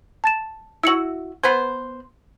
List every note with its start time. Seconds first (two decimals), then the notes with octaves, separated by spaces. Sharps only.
0.24 A5 A6 E7
0.83 E4 F#4 E6 C#7 F#7
1.43 B3 B4 C5 G#6